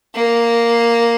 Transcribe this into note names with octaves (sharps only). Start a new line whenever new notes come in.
A#3